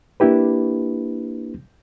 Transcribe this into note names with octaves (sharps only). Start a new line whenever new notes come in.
A#3 D4 E4 G4 B4